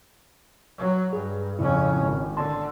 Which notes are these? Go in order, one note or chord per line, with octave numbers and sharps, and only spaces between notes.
F#3
G2 G#4
F2 A2 C#3 C#4 E4
G#1
D3 A5 C6